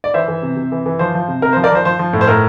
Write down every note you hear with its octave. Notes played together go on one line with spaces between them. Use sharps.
D5
E3 C5 E5
E3
C3
C3
E3
E3
F3 C5
F3
C3
C3 A#4
F3 C5
A#4 D5
F3 C5
F3 C5
F3
A2
C5
A2 A#4